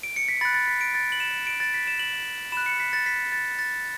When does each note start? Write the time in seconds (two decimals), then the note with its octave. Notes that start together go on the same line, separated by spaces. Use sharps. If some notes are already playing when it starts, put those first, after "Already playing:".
0.03 D7
0.16 C#7
0.28 B6
0.41 B5 F#6 A6
0.54 A6
0.67 B6
0.81 D7
0.95 A6
1.12 F#7
1.20 E7
1.47 D7
1.60 A6
1.74 B6
1.87 E7
1.99 F#7
2.52 B5 F#6 E7
2.66 C#7
2.80 B6
2.93 A6
3.06 B6
3.32 A6
3.59 A6